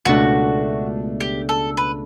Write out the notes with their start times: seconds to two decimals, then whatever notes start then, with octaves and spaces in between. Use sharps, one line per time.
0.05 C#2 B2 A3 D4 F#4
1.20 G4
1.49 A4
1.77 B4